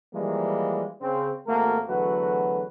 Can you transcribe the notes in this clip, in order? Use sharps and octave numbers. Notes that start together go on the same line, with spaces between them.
E3 F3 G3 G#3 A#3
C#3 C4
G#1 A3 A#3 F#4 A4 A#4
E2 D3 F#3 A3 F#4 B4